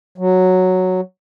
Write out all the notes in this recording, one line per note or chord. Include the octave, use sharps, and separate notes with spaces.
F#3